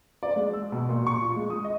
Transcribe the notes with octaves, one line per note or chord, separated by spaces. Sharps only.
D5
G#3
E6
B2
A#2
C#6
F4
G#3
D#6
D#5